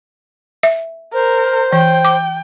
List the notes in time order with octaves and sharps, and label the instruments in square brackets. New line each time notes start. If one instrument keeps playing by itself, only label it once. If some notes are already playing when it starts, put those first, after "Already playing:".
[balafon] E5
[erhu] A#4 [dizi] C5
[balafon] E3 [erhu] G5
[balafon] D6